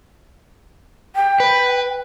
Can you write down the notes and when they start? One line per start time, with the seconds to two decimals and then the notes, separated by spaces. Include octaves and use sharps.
1.15 G5
1.40 B4